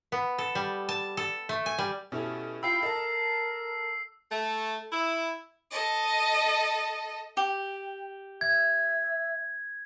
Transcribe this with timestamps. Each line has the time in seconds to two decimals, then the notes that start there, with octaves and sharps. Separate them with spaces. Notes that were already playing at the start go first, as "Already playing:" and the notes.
0.12 B3
0.38 A4
0.55 G3
0.89 A5
1.17 A4
1.49 A3
1.66 G#5
1.78 G3
2.12 B2 C#4 E4 G4 A4
2.63 F4 F5 G5 B5 E6 C7
2.83 A4 A#4 D#5 A5
4.30 A3
4.91 E4
5.71 A4 D#5
7.37 G4 G5
8.41 E5 G#6